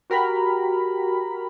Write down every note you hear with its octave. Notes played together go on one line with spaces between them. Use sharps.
F#4 G4 A#4 G5 A#5 B5